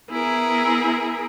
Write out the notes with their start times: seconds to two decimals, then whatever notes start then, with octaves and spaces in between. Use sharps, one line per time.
0.10 B3 E4 G#4 A#4